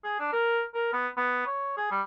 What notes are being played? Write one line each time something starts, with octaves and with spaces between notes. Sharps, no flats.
G#4
D4
A#4
A#4
B3
B3
C#5
G#4
G3